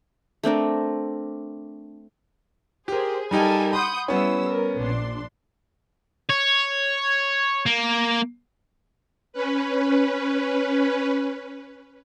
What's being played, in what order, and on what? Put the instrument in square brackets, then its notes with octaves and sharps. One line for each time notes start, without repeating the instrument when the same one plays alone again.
[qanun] A3 C4 D4 A#4
[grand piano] G4 A#4 [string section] G#4 C5
[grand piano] G3 D#4 G4 [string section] A4 A#4 G#5
[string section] F#5 D#6 G6 [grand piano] B5 C6
[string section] G3 E4 E6 [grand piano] B3 C#4
[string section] A#4
A#1 D4 C6
[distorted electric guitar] C#5
A#3
[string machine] C#4 B4